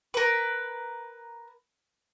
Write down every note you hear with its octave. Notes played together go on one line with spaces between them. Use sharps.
A#4 B4